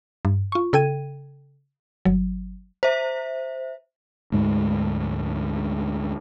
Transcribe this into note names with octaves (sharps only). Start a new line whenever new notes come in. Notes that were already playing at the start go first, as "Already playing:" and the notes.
G2
F4 C#6
C#3 A4 G5 G#6 D#7
G1 F#3
C5 E5
D2 G#2 G#3